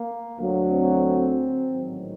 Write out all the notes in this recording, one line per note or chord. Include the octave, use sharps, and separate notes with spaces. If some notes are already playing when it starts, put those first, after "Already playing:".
Already playing: A#3
D2 D3 F#3
C4
A1 G#2 D#3 F#3